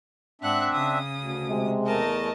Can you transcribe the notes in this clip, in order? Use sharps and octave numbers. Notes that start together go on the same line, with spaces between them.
G#2 C4 D4 E5 F#5 F#6
C#3 D#6
D2
C3 G#3
E2 A3 A#4 D#5 A5